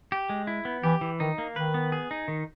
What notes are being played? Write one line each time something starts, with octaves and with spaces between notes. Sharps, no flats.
G4
G#3
E4
B3
E3 G4
E3
D#3 D#4
A#3
D#3 B4
B3
G#4
D#4
D#3